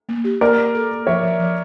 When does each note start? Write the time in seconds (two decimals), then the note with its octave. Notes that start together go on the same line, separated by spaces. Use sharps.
0.09 A#3
0.24 G4
0.41 A#3 A#4 D5
0.57 A#3
0.75 A4
0.91 A#3
1.07 F3 C#5 E5
1.23 F3
1.39 F3